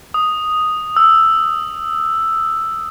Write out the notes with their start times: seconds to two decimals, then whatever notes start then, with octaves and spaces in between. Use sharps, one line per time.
0.14 D#6
0.97 E6